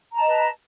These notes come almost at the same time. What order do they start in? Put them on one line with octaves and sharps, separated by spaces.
A#5 A5 D#5 B4